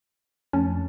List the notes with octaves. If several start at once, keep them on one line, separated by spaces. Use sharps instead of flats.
F2 A3 C#4 A5